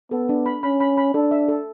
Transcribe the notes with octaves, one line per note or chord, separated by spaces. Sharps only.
B3 A4
D4
B5
C#4 B5
B5
B5
D4 A4
E5
A4